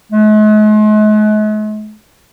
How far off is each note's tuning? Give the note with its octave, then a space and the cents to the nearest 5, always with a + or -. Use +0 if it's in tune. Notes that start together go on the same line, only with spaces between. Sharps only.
G#3 +45